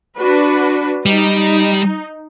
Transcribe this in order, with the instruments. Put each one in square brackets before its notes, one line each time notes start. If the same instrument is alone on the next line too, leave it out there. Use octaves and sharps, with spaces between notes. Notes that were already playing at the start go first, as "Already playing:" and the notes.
[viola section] D4 F#4 B4
[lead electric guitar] G3 [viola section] D#4